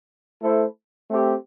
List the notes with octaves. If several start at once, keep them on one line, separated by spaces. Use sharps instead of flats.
A3 E4 A4 C5
A3 C4 G4